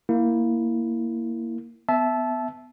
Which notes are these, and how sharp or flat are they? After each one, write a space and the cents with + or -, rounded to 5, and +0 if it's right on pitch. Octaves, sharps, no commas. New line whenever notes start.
A#3 +0 E4 +0
B3 +15 E5 +0 A5 -20